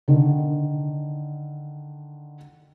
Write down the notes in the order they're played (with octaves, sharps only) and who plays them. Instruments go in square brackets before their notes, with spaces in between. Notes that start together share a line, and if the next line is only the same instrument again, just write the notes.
[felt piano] D3 D#3